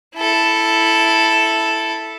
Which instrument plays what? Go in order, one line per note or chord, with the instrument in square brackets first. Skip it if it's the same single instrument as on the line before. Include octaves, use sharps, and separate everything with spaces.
[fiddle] E4 A4